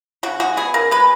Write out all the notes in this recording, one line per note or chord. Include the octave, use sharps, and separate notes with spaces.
C#3 F#4
G#3 F#4
B3 G#4
C#3 A#4
G#3 B4